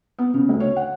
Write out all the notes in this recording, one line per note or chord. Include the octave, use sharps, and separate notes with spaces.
B3
C#3
D2
C#5
F#5